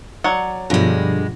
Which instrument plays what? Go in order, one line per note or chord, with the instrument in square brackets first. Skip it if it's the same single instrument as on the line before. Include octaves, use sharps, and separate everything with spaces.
[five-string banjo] F#3 F#5 [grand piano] D5 G#6
[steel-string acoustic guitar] G2 G#3 [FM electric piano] B2 F3 A#6 [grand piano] D3 G3